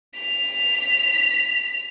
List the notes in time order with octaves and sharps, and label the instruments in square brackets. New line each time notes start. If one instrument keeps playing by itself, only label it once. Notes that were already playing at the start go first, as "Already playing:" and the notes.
[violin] B6 F7